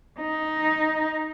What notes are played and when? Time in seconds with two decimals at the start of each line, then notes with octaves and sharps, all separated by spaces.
0.20 D#4